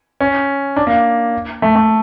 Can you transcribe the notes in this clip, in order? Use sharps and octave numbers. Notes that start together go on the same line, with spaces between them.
C#4
D4
A#3
A3
A3